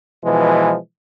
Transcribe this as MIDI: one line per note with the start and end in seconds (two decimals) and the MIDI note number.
0.24 0.76 47
0.24 0.76 52
0.24 0.76 53
0.24 0.76 56